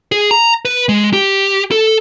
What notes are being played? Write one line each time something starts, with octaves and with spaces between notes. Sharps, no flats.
G#4
A#5
B4
G#3
G4
A4